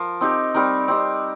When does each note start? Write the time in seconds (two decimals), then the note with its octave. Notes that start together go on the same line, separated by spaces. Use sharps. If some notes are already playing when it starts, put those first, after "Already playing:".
Already playing: F3 A#4
0.21 C4 D#4 G4
0.54 G3 C4 D#4 A#4
0.88 C4 G4 D#5